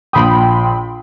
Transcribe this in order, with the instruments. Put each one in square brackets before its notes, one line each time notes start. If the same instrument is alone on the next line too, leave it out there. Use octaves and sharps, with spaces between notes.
[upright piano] A#1 D#6 [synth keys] G5 B5 C6